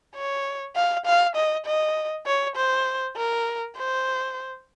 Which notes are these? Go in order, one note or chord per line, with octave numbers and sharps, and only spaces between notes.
C#5
F5
F5
D#5
D#5
C#5
C5
A#4
C5